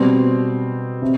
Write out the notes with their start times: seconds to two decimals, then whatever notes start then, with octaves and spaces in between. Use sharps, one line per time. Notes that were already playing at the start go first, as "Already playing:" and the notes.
Already playing: B2 G3 C4
1.02 C3